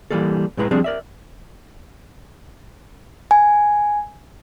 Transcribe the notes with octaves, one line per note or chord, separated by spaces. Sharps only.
E3 G3 A#3 A4
A2 G#3 E4 B4 A#5
F3 G3 C4 D4 G#4 A5
A#4 D5 E5
G#5